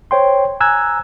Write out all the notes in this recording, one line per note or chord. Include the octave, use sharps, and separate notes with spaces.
C5 C#5 G5 C6
G#5 A#5 E6 F#6 G#6